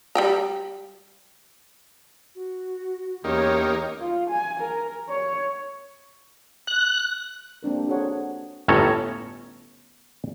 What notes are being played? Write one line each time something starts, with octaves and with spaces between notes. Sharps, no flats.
G3 G5 A#5
F#4
E2 A#3 C#4 D#4 G4 C#5
F4
G#5
A#4
C#5
F#6
A#3 C4 D4 A#4
F#4 G#4 A4 C5 C#5 F#5
G1 A2 C#4 A4 C#5 A#5